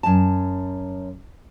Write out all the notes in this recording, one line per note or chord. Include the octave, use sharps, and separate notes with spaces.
F#2 A5